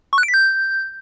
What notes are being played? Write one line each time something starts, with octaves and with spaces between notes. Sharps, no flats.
C#6
F#6
D7
B6
G6